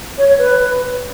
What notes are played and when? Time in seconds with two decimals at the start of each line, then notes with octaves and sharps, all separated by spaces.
0.18 C#5
0.28 C#5
0.38 B4